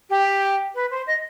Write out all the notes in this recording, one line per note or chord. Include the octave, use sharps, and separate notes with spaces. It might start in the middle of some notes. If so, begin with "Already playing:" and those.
G4
B4
C5
D#5